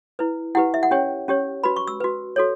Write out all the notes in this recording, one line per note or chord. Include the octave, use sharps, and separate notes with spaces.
E4 B4
E4 G4 B4 F#5
E5
F#5
C#4 G4 C#5 G5
C#4 G4 C#5
F#4 B4 B5
C#6
E6
F#4 B4
F#4 A4 C#5